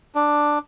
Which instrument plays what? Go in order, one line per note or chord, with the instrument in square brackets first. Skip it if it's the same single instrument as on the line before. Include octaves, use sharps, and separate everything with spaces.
[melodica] D4